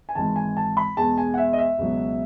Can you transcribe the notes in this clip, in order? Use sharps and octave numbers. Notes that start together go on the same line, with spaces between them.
G#5
G#1 G#2 E3 A5
G#5
A5
B5
E2 B2 G#3 A5
G#5
F#5
E5
D#5
E5
C#2 B2 F#3